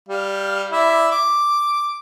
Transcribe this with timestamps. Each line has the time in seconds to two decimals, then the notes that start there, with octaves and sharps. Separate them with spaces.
0.09 G3 F5
0.72 E4 D5 E5
1.11 D6